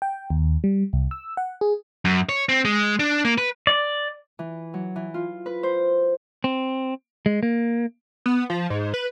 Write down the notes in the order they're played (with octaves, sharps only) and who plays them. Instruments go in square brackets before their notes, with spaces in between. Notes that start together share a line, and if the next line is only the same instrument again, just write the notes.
[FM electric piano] G5
D#2
G3
C2
E6
F#5
G#4
[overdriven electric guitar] F#2
C#5
C4
G#3
D4
A#3
B4
[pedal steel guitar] D5
[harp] E3
F#3
E3
F4
B4
C5
[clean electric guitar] C4
G#3
A#3
[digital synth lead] B3
F3
G#2
B4